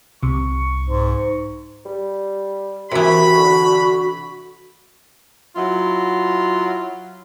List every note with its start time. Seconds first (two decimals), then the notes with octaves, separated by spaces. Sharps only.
0.23 C2 C3 C#6
0.87 G#2
1.85 G3
2.91 D#2 C3 E3 F#4 B5
3.37 D3
5.56 F#3 E4 F4